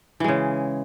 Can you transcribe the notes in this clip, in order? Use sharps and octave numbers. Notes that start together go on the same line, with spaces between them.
C#3 E3 G#3